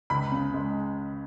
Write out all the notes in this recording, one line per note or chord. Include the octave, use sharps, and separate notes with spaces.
C#2 B5
C#3
G#3